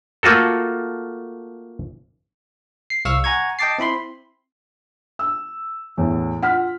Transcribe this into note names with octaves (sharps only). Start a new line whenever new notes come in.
A3 A#3 F4 F#4 A4
C7
C2 F5 C#6 E6 F6
F#5 G#5 A#5 C#6 G#6
D#5 G5 A5 D6 A6 C7
C4 E4 B5 C6
E6
E2 A2
F4 F#5 F6 B6